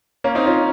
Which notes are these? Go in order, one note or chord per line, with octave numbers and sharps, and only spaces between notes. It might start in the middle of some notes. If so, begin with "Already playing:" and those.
A#3 C#4
C4 D#4
C#4 F4